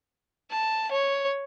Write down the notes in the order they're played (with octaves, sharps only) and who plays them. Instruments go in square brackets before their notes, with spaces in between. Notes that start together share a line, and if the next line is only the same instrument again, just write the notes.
[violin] A5
C#5